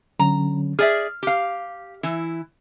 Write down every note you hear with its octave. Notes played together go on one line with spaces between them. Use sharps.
D3 F#3 C#4 A#5
G#4 D5 E5 F6
G4 F5
E3 E4